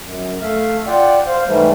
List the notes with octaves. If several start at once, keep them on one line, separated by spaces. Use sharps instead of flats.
F#2
A3 E5 F5
F4 D5 F#5 G5
C5 F5
G#2 E3 G3 A3